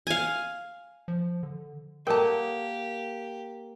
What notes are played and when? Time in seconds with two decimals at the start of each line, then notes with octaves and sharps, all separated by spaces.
0.07 F5 G#5
1.08 F3
1.43 D3
2.07 A#3 G4 A4 A#4 C#5 F#5 G5 A5